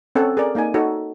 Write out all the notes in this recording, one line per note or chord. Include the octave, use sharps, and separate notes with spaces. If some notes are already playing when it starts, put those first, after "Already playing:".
C4 C#4 A4 C#5 F#5
G#4 A#4 D5
A#3 D#4 D5 G#5
D#4 F#4 A4 C#5